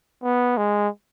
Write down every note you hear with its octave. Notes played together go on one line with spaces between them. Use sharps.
B3
G#3